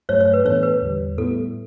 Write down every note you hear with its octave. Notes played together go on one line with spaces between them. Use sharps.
G2 F#3 A3 C#5
C#5
B4
A2 E3 B3 D4 A4 C#5
B4
E2 D3 G3
A2 G3 B3 E4 A4